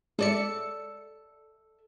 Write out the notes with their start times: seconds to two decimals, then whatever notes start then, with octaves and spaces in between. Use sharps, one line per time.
0.19 G#3 A4 D5 E5 C#7